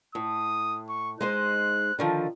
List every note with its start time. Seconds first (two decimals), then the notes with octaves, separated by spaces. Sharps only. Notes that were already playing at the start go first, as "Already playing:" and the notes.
0.15 A2 D#6
0.89 C#6
1.21 G#3 D#4 C5 F#6
1.99 D3 D#3 F3